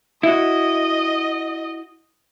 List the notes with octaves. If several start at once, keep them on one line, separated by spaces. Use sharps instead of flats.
E4 F#4 D#5